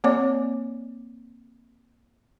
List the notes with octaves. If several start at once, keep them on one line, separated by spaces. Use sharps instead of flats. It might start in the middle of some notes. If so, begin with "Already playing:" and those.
A#3 C4 C#5 D5 D6